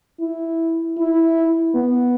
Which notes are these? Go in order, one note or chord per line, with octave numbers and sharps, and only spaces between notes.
E4
E4
B3